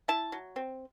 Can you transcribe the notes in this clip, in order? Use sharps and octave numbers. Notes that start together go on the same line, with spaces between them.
E4 A5
F#3
C4